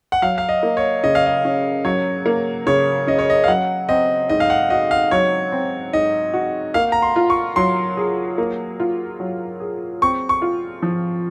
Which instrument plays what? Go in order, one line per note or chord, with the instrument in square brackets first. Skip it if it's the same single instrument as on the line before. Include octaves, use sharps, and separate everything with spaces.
[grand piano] F#5
[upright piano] F#3 [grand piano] F5
[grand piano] F5
D#5
[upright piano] A#3
[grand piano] C#5
[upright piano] C#3 [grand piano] D#5
[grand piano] F5
D#5
[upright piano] C#4
[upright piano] F#3 [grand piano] C#5
[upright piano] A#3
[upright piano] C#3 [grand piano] C#5
[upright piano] C#4 [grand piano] D#5
[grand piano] C#5
D#5
F5
[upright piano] F#3 [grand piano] F#5
[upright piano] C4 [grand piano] D#5
[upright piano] G#2 [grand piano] D#5
[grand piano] F5
F#5
[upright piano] F#4 [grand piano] D#5
[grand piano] F5
[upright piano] F#3 [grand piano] C#5
[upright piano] C4
[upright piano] G#2 [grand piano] D#5
[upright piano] F#4
[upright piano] A#3 [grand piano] F5
[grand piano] A#5
C6
[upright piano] F4
[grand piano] C#6
[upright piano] F#3 [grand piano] C6
[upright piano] G#4
A#3
F4
F#3
G#4
[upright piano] C4 [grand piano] C#6
[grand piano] C#6
[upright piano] F4
F3